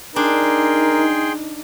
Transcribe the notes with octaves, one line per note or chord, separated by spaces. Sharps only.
D4 D#4 G#4 A#4 G5 C6